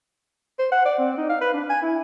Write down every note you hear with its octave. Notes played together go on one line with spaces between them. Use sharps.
C5
F#5
D5
C4
D#4
F5
B4
D4
G#5
E4